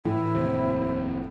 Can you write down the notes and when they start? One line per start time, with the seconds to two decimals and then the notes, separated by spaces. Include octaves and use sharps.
0.05 A2 E3 E4
0.35 F1 D#2 C3 C5